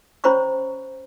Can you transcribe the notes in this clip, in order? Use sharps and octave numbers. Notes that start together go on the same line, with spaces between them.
C#4 C5 C#5 A#5 B5 C#6